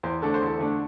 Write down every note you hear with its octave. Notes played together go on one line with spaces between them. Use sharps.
E2 C5
D3 A3 D4 A4
C5
E2 A4
D3 A3 D4